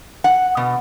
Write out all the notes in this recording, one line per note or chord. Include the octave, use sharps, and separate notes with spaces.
F#5
B2